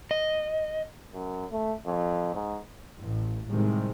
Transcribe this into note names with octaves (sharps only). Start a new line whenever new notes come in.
D#5
F#2
A3
F2
G#2
A1
A2 C3 D#3 G3 G#3